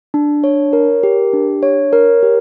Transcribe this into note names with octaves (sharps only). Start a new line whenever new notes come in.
D4
C#5
A#4
G4
D4
C#5
A#4
G4